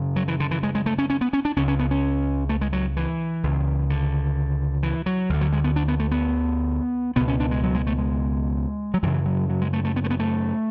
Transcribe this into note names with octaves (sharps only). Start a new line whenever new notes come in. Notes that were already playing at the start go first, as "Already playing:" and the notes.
Already playing: F#2 C#3
F#3
E3
D3
E3
G#3
G#3
A3
C#4
C#4
B3
C#4
D4
C#2 C#3 C#4
C#4
B3
C#4
A3
G#3
F#3
E3
C#2 C#3
D3
E3
F#3
D2 D3
F#3
G#3
B3
D4
B3
A3
B3
C#2 B2 B3
C#4
D4
G#3
F#3
G#3
A3
G#3
F#3
F#2 C#3 E3
F#3
F#3
G#3
A3
A3
B3
A3
B3
A3